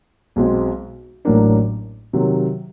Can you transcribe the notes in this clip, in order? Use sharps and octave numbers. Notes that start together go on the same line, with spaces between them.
B1 B2 G#3 C4
A1 A2 F#3 A#3 D4
C3 D#3 F#3